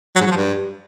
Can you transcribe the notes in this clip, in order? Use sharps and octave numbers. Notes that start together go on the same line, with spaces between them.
F#3
G#2
F#3
F3
G2